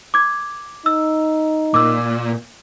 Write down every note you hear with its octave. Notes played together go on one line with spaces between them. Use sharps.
D6 G#6
D#4 E6
A#2 D6 E6